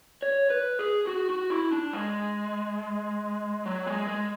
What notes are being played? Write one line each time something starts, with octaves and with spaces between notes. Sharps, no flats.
C#5
B4
G#4
F#4
F#4
E4
D4
G#3
F#3
G#3
G#3